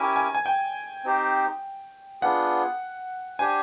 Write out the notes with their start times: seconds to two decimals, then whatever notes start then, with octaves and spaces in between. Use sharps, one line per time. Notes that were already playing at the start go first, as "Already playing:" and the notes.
Already playing: C#4 E4 G4 A#4 G#5
0.16 G#5
0.35 G#5
0.46 G5
1.04 C4 D#4 G4 C5
2.22 B3 D4 F4 G#4 F#5
3.39 D4 G4 C5 G#5